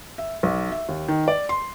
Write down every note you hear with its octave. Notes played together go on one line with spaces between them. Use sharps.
E5
B1
E5
D#2
D#3
D5
C6